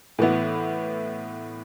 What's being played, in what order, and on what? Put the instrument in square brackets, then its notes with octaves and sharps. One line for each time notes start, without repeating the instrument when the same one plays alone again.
[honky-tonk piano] A2 E3 B3 E4